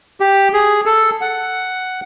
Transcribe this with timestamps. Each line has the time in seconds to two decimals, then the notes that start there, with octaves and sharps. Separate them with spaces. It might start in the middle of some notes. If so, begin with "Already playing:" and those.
0.20 G4
0.53 G#4
0.86 A4
1.21 F#5